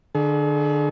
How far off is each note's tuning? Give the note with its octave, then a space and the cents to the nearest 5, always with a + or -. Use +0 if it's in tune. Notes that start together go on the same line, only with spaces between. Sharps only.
D3 +25 G#4 +40